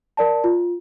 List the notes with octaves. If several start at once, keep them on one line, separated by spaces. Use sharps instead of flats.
A#4 D5 A5
F4